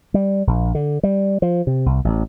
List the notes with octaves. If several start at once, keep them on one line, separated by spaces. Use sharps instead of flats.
G3
A#1
D3
G3
F3
C3
C2
A1